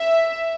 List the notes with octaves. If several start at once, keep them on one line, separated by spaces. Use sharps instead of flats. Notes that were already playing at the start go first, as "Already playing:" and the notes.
Already playing: E5